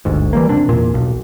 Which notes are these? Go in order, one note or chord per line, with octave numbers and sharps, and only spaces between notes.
G1 D2 G#2
E3 G3 A#3
D#1 C3 D4
E2 A#2
B1